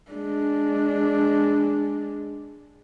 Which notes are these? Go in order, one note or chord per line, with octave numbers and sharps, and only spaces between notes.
G#3 D4